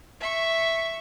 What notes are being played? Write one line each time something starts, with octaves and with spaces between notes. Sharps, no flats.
E5 C#6